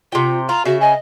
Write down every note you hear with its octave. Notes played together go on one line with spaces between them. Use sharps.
C3 F4 G5
F4 A#5
C#3 F#4 E5
D#5 G#5